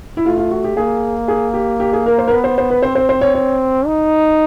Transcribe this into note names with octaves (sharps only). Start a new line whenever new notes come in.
E4
A3 F4
F4
F#4
G4
A#3 G#4
G#4
G4
G4
G#4
A#4
C5
A#4
B3 B4
C5
C5
B4
C4 C5
C5
C5
C#5
C#5
D#4